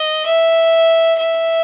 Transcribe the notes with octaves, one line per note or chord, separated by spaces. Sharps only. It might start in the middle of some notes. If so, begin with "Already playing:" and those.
Already playing: D#5
E5
E5